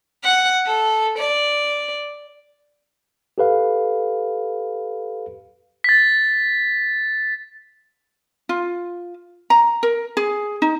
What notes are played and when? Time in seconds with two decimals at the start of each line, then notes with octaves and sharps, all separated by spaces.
0.24 F#5
0.66 A4
1.18 D5
3.38 G4 A4 B4 F5
5.84 A6 B6
8.49 F4
9.50 A#5
9.83 A#4
10.17 G#4
10.62 D#4